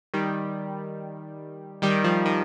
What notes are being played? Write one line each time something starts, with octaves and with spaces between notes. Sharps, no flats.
D#3 G3
D#3 G3
F3
D#3